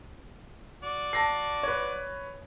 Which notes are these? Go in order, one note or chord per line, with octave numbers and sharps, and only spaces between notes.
F#4 D5
A5 A#6 C7
B4 C#5